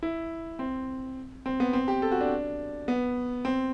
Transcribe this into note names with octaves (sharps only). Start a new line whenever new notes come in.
E4
C4
C4
B3
C4
G4
A4
F#4
D4
B3
C4